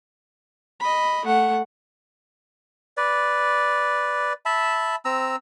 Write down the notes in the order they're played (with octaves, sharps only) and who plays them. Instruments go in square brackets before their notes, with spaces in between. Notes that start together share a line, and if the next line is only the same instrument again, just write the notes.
[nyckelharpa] D#5 B5
A3 F#5
[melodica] B4 D5
E5 A5 B5
C4 A#5 E6